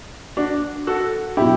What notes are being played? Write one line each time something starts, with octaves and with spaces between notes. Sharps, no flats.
D4 F#4
F#4 A4
B2 F#3 E4 G4